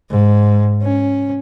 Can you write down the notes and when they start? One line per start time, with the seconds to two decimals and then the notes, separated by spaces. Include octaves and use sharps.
0.10 G#2
0.82 C#4